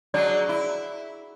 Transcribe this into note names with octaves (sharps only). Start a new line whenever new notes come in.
F#3 G#3 D4 D5
E4